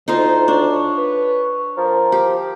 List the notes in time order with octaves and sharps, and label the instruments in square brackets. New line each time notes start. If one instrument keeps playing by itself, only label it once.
[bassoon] D2 [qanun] D#4 F4 C5
[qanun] D4 [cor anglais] C#5
[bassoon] B4
[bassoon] F3 [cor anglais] A#4
[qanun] G4